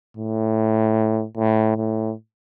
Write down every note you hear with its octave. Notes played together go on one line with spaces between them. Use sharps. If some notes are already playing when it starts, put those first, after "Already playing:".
A2
A2
A2